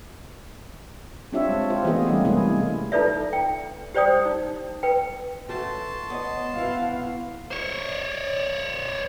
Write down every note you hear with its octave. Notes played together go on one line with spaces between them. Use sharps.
C4 D4 F4 G4 C#5 E5
G#3
F4 G4 C5
E3 A3 B3 F4 G#4 D#5
G3 G#3 C#4
C3 G#3 A#3 E4 G#4
D#4 F4 A4 B4 D5 E5
G5
G4 C5 D5 G5 D#6
D#4
B4 G5
E3 A3 C#4 F#4 A5 C6
B3 C#5 D#5
C3 B3 E4 F#4 B4 F5
C5 C#5